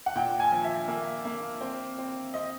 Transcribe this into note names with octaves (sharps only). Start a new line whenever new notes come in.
F#5
A#2 G5
G#5
F3
E5
A#3
A#3
C4
C4
C4 D#5